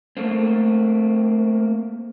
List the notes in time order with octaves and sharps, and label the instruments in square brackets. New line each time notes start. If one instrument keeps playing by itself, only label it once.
[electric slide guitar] A3 A#3 C4